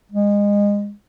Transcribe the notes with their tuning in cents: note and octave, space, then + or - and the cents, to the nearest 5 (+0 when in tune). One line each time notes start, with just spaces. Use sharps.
G#3 -25